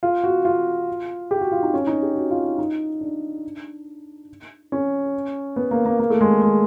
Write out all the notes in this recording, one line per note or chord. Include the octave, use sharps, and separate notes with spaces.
F4
F#4
F4
G4
F#4
F4
D#4
C#4
D#4
G4
F#4
F4
E4
D#4
D4
C#4
B3
A#3
A#3
A#3
A3
G#3
G#3